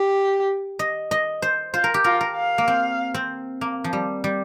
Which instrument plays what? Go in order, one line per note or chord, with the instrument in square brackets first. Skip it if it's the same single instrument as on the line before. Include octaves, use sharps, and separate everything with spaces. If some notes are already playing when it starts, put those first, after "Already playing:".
Already playing: [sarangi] G4
[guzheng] D#5
D#5
C5
[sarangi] F4 [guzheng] C5
[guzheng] A#4
G4
[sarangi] F4 [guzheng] A#4
[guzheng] A#4
[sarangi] F5
[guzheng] A#3
C4
C4
A#3
F3
G3
G3